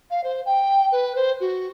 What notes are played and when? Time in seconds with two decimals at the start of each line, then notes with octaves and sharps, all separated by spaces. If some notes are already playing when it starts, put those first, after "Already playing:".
0.11 F5
0.24 C5
0.46 G5
0.92 B4
1.16 C5
1.40 F#4